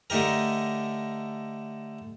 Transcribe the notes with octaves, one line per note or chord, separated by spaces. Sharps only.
D3 A3 D#4 G4 A#4